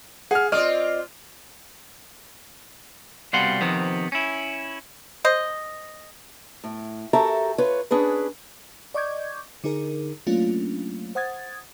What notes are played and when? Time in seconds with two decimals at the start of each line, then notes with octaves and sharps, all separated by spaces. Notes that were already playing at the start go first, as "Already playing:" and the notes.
0.31 G#4 F#5 F6
0.52 C4 F4 D5 D#5 F6
3.33 C2 B2 G3 F5 F#5 C6
3.61 C3 D#3 F3 B3 C4
4.12 C#4 E4
5.25 C5 D#5
6.64 A2
7.13 F#4 G4 A4 A#4 E5 A#5
7.58 F4 B4 C#5
7.91 C#4 D4 G#4 B4
8.94 D5 D#5 C#6 D6 G6 G#6
9.64 D3 D#4 G#4 A#4
10.27 F#3 A3 A#3 C#4 D4 F4
11.15 C5 F#5 D#6 G#6 A6